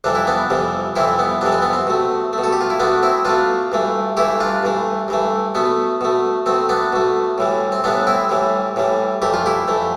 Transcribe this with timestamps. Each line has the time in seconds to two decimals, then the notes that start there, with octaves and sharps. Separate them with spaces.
0.04 F2 C3 E3 G3 D4
0.15 E4
0.27 B3 D4
0.50 F2 C3 E3 G3
0.96 F2 C3 E3 G3 C4 E4
1.19 B3
1.41 F2 C3 E3 G3 D4
1.52 C4
1.62 B3
1.73 C4
1.87 B2 A3
2.33 A3
2.38 B2
2.44 A4
2.53 G4
2.61 F4
2.70 E4
2.80 B2 A3 B3 D4
3.03 C4 E4
3.25 B2 A3 D4 F4
3.72 G2 E3 A3
4.17 G2 E3 A3 E4 G4
4.40 D4 F4
4.63 G2 E3 A3
5.08 G2 E3 A3
5.55 B2 A3 B3
6.01 B2 A3
6.46 B2 A3 C4
6.69 B3 D4
6.93 B2 A3
7.38 A2 E3 G3
7.72 C4
7.84 A2 E3 G3 B3 D4
8.07 C4 E4
8.29 A2 E3 G3
8.76 A2 E3 G3
9.22 F2 E3 A3 G4
9.34 F4
9.46 E4 G4
9.68 F2 E3 A3